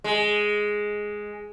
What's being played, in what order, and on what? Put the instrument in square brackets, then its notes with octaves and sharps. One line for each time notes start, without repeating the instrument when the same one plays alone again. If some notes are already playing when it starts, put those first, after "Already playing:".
[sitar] G#3